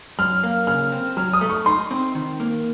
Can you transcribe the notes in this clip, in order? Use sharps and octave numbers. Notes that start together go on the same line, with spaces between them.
F#2 F6
A#3
C#3 F6
C4
F#3 F6
D#6
A3
C#6
D#4 C6
C4
D#3
A#3